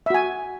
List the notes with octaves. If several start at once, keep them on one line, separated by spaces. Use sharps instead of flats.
F#4 E5 G#5